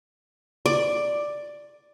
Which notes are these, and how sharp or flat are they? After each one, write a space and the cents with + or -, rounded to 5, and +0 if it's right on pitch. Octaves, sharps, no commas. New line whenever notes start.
D5 +5